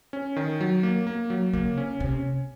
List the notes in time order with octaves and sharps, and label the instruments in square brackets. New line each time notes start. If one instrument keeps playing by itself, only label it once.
[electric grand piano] C#4
D#3
F#3
A#3
A#3
F#3
[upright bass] C#3 [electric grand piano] A#3
[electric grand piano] C#4
[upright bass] C3 [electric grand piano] C#4